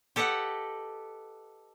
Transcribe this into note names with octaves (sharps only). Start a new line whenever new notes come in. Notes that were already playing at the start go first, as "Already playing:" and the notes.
G4 A4 B4 D#5 F#5